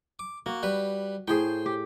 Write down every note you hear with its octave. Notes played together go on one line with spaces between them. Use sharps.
D6
A#3 F#4
G3 B4
A2 G#4 C5 G5
G4